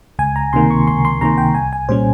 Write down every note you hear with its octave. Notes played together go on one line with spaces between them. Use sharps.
C#2 G#5
A#5
C3 D#3 A#3 C6
C#6
C#2 C6
C6
C3 D#3 A#3 A#5
G5
C2 G#5
G#5
A#2 G3 C#4 C5